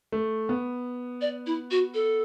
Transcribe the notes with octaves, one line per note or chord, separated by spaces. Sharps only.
A3
B3
D5
E4
F#4
A4